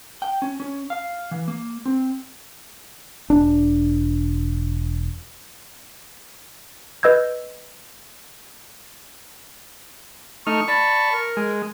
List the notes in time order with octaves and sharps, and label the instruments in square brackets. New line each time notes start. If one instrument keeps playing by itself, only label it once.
[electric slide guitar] G5
C#4
C#4
F5
E3
A#3
C4
[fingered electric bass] E1 D4
[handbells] B4 D#5 E6 G6 G#6
[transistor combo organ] A3 D#4 F6 [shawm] C#6
[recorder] D5 [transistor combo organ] A5 B5
[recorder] A#4
[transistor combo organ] G#3